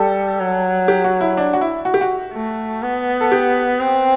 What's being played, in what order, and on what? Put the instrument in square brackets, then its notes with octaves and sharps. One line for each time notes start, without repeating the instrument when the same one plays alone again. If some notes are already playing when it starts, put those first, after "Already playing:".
Already playing: [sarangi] G3 [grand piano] A4
[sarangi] F#3
[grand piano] G4
F#4
E4
D4
F#4
E4
F#4
G4
F#4
[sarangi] A3
B3
[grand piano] A4
G4
[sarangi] C4